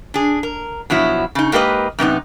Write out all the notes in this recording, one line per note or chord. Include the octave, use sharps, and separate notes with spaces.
D4 G#4
A#4
B2 F3 F#3 E4
C#3 D#4
G#2 A#3 G4 B4 D#5
F#2 C3 B3 D#4